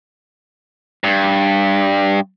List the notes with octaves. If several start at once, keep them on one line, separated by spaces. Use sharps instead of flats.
G2